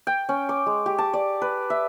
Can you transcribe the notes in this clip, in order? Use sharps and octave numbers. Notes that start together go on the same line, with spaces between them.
G5
C#4
D6
G#3
G4
A5
D5
B4
E5